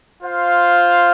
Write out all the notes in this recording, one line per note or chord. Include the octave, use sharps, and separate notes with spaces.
F4 C5 F5